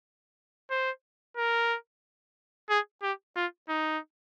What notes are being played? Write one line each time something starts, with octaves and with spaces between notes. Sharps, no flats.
C5
A#4
G#4
G4
F4
D#4